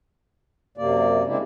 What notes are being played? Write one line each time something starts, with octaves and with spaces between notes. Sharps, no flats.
F#2 C3 A#3 D5
C#3 G#3 C4 D4 E4 G4